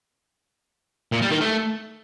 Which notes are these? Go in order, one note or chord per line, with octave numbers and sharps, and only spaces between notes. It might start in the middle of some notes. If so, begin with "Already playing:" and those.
A#2
G3
D#3
A3